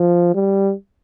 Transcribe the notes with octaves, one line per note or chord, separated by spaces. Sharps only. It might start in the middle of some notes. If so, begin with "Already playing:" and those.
Already playing: F3
G3